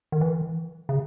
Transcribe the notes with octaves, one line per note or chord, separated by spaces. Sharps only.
D#3
E3
C#3